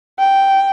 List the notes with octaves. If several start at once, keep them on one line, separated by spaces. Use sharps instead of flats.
G5